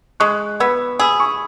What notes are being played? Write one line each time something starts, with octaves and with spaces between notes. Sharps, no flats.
G#3 C#6 F#6
B3 E6 G#6
G#4 B5 E6
G#5 C#6